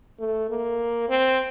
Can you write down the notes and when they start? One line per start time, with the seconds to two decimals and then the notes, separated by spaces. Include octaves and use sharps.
0.19 A3
0.49 A#3
1.09 C4